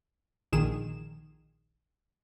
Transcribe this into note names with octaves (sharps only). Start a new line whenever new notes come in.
A#1 D#3 G#4 E7